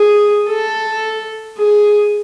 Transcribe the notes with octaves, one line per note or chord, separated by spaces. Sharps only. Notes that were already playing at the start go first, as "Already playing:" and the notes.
Already playing: G#4
A4
G#4